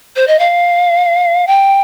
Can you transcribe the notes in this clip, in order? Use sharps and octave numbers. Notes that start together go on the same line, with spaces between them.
C5
D#5
F5
G5